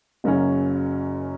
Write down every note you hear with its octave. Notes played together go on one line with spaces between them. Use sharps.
F#1 F#2 C#3 F#3 C#4